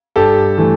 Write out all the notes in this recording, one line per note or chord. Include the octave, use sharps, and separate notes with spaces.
G2 G4 A4
E3 A3